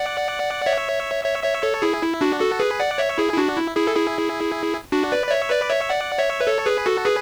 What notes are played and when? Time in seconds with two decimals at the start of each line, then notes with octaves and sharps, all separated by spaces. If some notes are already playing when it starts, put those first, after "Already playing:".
Already playing: D5 F#5
0.66 C#5 E5
1.24 C#5 E5
1.43 C#5 E5
1.63 A4 C#5
1.82 E4 G#4
2.03 E4
2.21 D4 F#4
2.40 F#4 A4
2.59 G#4 B4
2.80 D5 F#5
2.98 C#5 E5
3.18 E4 G#4
3.33 E4
3.37 D4 F#4
3.56 E4
3.76 E4 G#4
3.87 A4
3.96 E4 G#4
4.92 D4 F#4
5.12 B4 D5
5.27 D5
5.31 C#5 E5
5.50 B4 D5
5.69 C#5 E5
5.89 D5 F#5
6.18 C#5 E5
6.40 B4
6.47 A4 C#5
6.66 G#4 B4
6.86 F#4 A4
7.05 G#4 B4